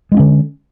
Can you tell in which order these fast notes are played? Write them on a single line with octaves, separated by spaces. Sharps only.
G#3 D4 C#4 D3